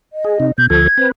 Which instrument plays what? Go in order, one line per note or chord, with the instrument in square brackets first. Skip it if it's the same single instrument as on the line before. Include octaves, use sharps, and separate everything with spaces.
[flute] D#5
[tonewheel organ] G#4
C3 D#4
[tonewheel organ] B2 [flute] G6
[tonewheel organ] D2 F3 A4 [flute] G#6
[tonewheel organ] C4 B4